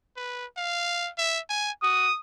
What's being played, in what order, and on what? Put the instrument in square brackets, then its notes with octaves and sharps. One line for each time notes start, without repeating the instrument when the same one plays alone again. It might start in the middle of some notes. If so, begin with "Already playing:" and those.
[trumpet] B4
F5
E5
G#5
[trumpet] F#4 [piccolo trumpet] D#6